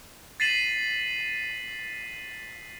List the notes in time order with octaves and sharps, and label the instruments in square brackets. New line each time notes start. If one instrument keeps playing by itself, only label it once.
[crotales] A6 B6 C7 D#7 E7 F#7